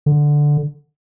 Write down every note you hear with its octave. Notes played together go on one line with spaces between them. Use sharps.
D3